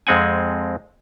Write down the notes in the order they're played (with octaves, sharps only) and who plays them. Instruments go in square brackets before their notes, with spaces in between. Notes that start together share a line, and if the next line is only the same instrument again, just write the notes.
[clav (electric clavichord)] F2 G#3 C4 F#5 G#5